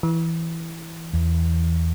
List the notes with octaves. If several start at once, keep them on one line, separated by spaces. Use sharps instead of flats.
E3
E2